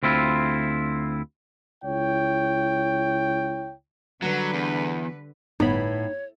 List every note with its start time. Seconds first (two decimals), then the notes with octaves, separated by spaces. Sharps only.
0.03 D2 C4 E4 F4
1.84 C#2 E4 C#5 G5
4.22 D3 F#3 G3 B4
4.54 E2
5.60 G1 A2 B3 D#4 C#5 B5